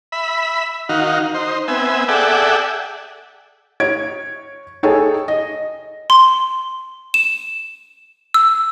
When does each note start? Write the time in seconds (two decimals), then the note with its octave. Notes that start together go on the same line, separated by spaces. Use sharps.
0.12 E5 B5
0.89 D#3 D#4 F#4 F5
1.34 D#4 C5
1.68 B3 C4 E5 G#5
2.08 G#4 A4 D5 E5 F#5 G5
3.80 C#5 G#6 D7
4.83 D#4 G#4 A4 C#5 G5 G#5
5.28 D#5
6.10 C6
7.14 E7
8.34 E6